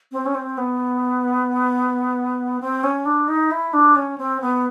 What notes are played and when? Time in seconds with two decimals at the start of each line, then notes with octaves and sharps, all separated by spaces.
0.12 C4
0.26 C#4
0.35 C4
0.58 B3
2.60 C4
2.84 C#4
3.05 D4
3.28 D#4
3.51 E4
3.73 D4
3.96 C#4
4.18 C4
4.41 B3